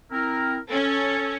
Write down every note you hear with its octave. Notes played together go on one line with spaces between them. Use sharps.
C4 E4 A#4
C#4 A4